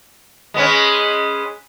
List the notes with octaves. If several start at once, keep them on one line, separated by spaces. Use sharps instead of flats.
G#3 B3 C#4